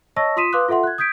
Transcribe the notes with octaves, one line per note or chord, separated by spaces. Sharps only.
C#5 D#5 A5 C#6 E6 A#6
F4 C6 D#6 B6 D#7 E7
B4 F5 C6 D6 D#6 F#6
F4 A4 E5 F#5 C6
F#6 G#6
D#6 G6 G#6 B6 D7